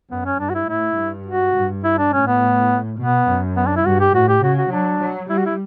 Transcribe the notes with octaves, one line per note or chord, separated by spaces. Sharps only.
F#2 B3
C#4
G2 D4
F#4
E4
A2 E4
G2
F#4
G2
E4
D4
A2 C#4
B3
B2 B3
F#2
B3
D4
E4
G2 F#4
G4
A2 F#4
G4
C#3 F#4
F#4
F#3 D4
F#3
G3 E4
F#4
E4